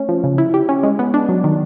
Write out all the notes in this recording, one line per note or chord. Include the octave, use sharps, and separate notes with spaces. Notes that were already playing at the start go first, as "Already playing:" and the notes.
Already playing: A3 C#4
F3
C#3
E4
G4
C#4
G#3
B3
D4
F#3
D#3